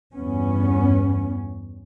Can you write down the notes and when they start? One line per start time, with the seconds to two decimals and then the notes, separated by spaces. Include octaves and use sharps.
0.14 E2 G2 B3 C#4